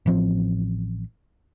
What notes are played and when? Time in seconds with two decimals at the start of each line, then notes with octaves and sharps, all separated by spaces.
0.06 A1 F3 C4